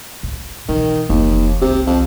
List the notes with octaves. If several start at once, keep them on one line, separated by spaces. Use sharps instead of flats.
A2
B2 D#3 E3
F1 D#2 E3
G1 C2 C3
F2